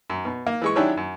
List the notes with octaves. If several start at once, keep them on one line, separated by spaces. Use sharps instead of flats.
F#2
B2
A#3
E3 G#3 C#6
D#3 F#3 C#4 D4 E4 G4
F#2